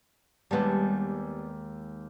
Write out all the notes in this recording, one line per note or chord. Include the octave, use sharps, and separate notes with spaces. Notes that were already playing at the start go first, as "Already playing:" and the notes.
D#2 G3 G#3 B3 A5